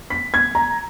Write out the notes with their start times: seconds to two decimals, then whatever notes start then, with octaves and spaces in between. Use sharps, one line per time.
0.10 B6
0.34 G#6
0.55 A#5